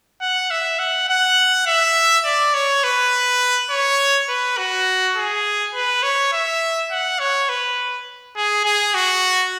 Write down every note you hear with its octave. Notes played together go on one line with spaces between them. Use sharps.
F#5
E5
F#5
F#5
E5
D5
C#5
B4
C#5
B4
F#4
G#4
B4
C#5
E5
F#5
C#5
B4
G#4
G#4
F#4